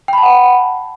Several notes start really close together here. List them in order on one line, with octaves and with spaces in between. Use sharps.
G5 B5 A5 F#5